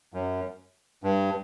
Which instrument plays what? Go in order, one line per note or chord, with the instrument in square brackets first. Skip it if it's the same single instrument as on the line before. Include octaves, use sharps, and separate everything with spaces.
[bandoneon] F#2
G2